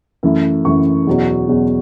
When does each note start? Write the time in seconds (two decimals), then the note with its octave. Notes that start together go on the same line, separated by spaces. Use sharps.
0.23 F#2 E3 A3 E4
0.65 F#2 E3 A3 E4 C#6
1.07 E2 B2 F#3
1.48 E2 B2 F#3